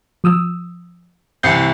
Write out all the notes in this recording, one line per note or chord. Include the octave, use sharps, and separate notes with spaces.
F3 D#6 E6
C2 E3 G6 C7 C#7